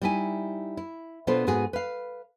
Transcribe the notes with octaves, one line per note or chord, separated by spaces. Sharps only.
G3 D#4 E4 E5 G#5
E4
B2 B3 D4 F4 A4 C5
G#2 B3 F#4 G#4 G#5
B4 F5